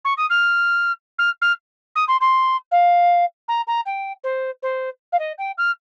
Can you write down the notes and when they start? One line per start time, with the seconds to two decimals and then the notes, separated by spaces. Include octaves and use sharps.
0.05 C#6
0.17 D#6
0.30 F6
1.19 F6
1.42 F6
1.96 D#6
2.08 C6
2.21 C6
2.71 F5
3.48 A#5
3.67 A#5
3.86 G5
4.24 C5
4.63 C5
5.12 F5
5.19 D#5
5.38 G5
5.58 F6